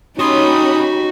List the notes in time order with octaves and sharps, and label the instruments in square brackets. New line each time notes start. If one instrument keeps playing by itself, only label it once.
[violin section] C#4 G4 B5 [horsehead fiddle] D#4 [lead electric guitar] F#4 C6 [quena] D#6